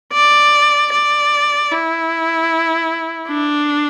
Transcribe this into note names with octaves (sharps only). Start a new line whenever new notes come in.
D5
D5
E4
D4